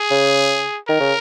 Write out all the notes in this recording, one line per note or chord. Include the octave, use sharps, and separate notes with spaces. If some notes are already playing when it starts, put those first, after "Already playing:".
Already playing: G#4
C#3
D#3 A#4
C#3